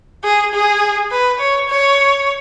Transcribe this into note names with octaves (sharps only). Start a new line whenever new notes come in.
G#4
G#4
B4
C#5
C#5